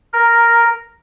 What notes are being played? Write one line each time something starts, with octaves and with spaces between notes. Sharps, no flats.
A#4